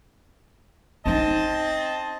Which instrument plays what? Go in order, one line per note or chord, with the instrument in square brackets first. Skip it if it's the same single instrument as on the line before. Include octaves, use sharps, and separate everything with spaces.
[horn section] C4 D#5 A5 [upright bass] C#4 D#4